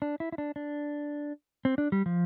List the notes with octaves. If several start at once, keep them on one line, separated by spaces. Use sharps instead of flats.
D4
E4
E4
D4
D4
C4
D4
G3
F3